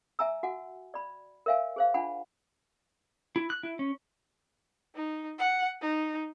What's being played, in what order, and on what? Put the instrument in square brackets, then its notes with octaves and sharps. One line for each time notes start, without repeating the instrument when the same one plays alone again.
[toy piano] E5 G#5 A#5 E6
F#4 F#5 G#5
D5 B5
A#4 C#5 E5 F5 G#5
G#4 C5 F5
D4 F4 F#5 G#5 B5
[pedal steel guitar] E4
F#6
E4
C#4
[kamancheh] D#4
F#5
D#4